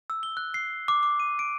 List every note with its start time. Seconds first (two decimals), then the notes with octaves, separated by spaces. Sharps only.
0.10 E6
0.23 G7
0.37 F#6
0.54 C7
0.88 D6
1.03 D6
1.20 D#7
1.39 D7